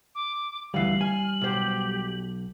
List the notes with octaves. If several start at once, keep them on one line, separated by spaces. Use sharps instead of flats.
D6
D2 E3 G3 F5 F#7
G#5 F6
B1 G4 C5